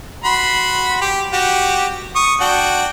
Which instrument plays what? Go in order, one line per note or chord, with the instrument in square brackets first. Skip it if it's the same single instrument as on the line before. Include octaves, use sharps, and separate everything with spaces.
[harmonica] F#4 B5 C6
G4
F#4 G4
C#6 D#6
D4 F#4 G5